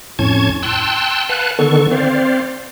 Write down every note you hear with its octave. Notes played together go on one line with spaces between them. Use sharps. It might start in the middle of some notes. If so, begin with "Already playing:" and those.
F2 A2 C#4 A5 C#6 G#6
G5 A5 C6 E6 F#6
B4 F5 F#5 G#5 A5 F#6
D3 D#3 B3 A4 C#6
C4 C5 D5 F5